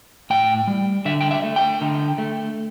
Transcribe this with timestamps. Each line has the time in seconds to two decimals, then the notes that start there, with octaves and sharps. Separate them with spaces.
0.30 A2 G5
0.68 G3
1.05 D3 E5
1.21 G5
1.31 E5
1.44 A3
1.56 G5
1.81 D3
2.18 A3